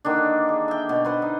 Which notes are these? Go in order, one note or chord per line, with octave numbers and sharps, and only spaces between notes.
D3 D#3 A#3 D4
G#4
E5 G5
B2
B4 C5 F#5
D#4